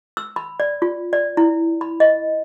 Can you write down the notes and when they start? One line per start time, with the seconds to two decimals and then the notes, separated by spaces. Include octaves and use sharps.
0.17 E6
0.36 B5
0.60 D5
0.82 F4
1.13 D5
1.37 E4
1.81 B5
2.00 D#5